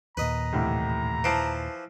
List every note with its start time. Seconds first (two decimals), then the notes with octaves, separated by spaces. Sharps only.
0.17 D#2 A#2 B4 D#5 A#5
0.53 C2 A2 E3
1.24 E3 F3 A5 C7 D7